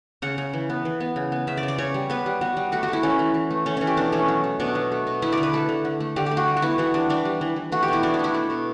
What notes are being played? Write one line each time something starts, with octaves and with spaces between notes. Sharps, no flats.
C#3 F#5
C#3
E3
B3
E3
B3
C#3
B3
C#3 E5
D5
C#3
D5
C#3 C#5
G3
B3 B4
G3
B3 F#4
G3
A3 F#4
F#4
A3 E4
E3 C#4
E3
E3
A3
A3 C#4
E3 C#4
G4
B2 D4
A3 C#4
F#3
A3
B2 D4
F#3
A3
B2
A3 E4
D5
D3
B4
A3 A4
D3
D3
A3
D3 G4
A3 G4
F#4
G3
F#4
B3 E4
E3 F#4
G3 D4
E3 D4
G3
E3
E3
A3 F#4
G4
B2 E4
B2 D4
D4
A3 E4
A3
B2